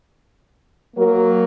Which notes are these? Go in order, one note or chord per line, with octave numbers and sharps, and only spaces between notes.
F#3 A#3 F#4 A#4